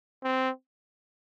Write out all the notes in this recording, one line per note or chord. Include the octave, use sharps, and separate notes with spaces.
C4